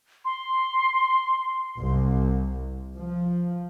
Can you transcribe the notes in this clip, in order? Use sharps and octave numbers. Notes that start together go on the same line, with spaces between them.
C6
C2
F3